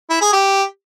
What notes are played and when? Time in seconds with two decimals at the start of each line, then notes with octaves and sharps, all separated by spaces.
0.10 E4
0.21 G#4
0.33 G4